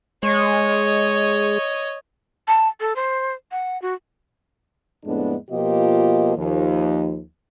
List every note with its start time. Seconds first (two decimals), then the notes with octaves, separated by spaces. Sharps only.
0.23 G#3 C#5 D#5
2.48 A5
2.80 A4
2.96 C5
3.51 F#5
3.82 F#4
5.05 F2 A2 G#3 B3 D4
5.51 B2 F3 A#3 F4 G4 D#5
6.37 D#2 F3